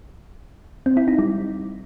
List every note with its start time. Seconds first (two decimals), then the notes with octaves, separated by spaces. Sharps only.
0.86 C4
0.97 E4
1.08 D#4
1.19 G3